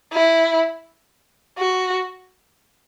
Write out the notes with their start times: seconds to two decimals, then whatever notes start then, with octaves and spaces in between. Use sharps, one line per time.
0.12 E4
1.58 F#4